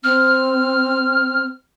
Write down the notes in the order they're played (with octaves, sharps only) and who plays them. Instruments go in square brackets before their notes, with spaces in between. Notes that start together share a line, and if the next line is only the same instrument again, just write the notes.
[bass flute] C4 [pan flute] F6